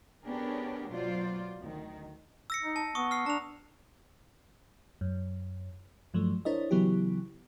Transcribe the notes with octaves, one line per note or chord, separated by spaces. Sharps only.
B3 C#4 D4 G4 G#4 A#4
B2 F#3 F4 C5 D5
D2 D#3
E6 A#6 C#7
D#4
A5
B3 C#6 D#6
F6 C7
D4 A#5 F7
F#2
G2 F3 F#3 A3
D4 E4 A#4 C5 C#5 D#5
C#3 E3 F#3 B3 E4 G4